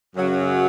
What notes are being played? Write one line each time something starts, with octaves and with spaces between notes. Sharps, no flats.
F#2 C#3 F#3